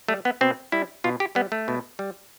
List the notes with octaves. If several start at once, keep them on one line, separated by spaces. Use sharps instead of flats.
G3 A3
B3
B2 C4
G3 E4
B2 F4
G4
G3 B3
A3
B2
G3